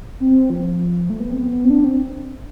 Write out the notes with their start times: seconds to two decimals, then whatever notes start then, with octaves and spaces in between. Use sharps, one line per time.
0.20 C4
0.50 F3
1.10 A3
1.20 B3
1.30 C4
1.40 B3
1.65 C4
1.70 D4
1.85 C4